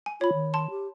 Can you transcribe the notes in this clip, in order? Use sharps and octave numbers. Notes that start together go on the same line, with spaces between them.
G#5
F4 C#5 B5
D#3
A5 C6
G4